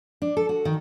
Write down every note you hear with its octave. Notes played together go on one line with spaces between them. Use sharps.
D4
A4
F#4
D#3